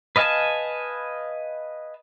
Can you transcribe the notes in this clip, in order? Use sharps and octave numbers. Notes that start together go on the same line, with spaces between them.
B4 D#5 F5 G#5 A5